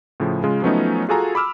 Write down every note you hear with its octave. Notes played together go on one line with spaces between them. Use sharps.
A2 C#3 F3
C#3 G#3 F4
F3 F#3 A3 B3 C#4 D#4
F4 F#4 G#4 A4 G#5 A#5
B5 D6 E6 F6